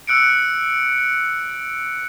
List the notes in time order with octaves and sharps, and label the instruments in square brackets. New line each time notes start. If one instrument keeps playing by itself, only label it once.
[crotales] E6 F#6 C#7 D7